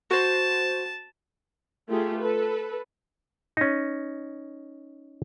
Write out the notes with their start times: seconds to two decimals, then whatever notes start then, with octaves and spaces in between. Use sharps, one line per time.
0.11 F#4 C5 A5
1.89 A3 F4 G4 G#4
2.21 A4 B4
3.57 C#4 D#4